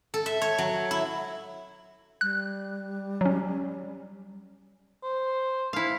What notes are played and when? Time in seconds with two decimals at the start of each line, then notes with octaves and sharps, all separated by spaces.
0.14 A4
0.26 E5
0.42 C#5
0.58 F#3
0.91 E4
2.21 G3 F#6
3.21 F#3 C#4
5.03 C5
5.73 E4 F5